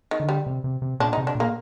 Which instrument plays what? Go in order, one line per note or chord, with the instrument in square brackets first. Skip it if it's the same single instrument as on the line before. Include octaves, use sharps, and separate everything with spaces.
[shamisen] D#3
[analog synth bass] D3
[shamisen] G3
[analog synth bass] C3
C3
C3
[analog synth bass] A#2 [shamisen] D4
[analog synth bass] C3 [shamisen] D#4
[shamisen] D4
[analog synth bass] A#2
[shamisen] A#3